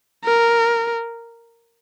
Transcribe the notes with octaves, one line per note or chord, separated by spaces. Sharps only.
A#4